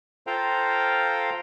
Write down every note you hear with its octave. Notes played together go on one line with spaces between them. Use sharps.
F4 A4 C5 F5 G5 A#5